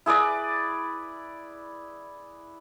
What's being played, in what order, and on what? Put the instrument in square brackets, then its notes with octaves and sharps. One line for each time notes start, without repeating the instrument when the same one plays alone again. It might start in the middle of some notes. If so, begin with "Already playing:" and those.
[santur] E4 G#4 B4 D5